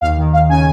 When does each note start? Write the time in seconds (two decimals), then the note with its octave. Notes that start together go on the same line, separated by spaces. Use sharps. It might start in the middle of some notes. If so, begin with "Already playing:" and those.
0.01 D#2 F5
0.17 D#3
0.33 D#2 F5
0.49 C#3 G#5